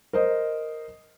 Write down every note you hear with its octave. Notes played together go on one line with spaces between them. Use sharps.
A#4 C5 D#5